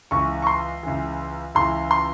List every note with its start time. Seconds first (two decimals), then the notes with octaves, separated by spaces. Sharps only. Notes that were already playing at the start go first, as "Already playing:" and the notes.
0.11 C#2 C#3 E3 C#6
0.42 C#6
0.47 C6
0.83 C#2 C#3 E3
1.55 C#2 C#3 E3 C6
1.91 C6